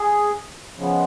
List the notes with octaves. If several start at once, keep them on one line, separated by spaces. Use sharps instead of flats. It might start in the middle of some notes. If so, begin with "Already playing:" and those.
Already playing: G#4
C#3 F3 G#3 B3